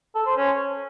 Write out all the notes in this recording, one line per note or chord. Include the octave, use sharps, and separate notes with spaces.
A4
C5
C#4